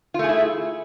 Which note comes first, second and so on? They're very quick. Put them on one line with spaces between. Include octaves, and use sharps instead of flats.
F4 A3 G#4 E4